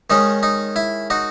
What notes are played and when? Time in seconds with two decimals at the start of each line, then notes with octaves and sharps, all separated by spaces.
0.10 D#3 G#3 C#4 D#4
0.43 D#4
0.76 E4
1.10 D#4 F#4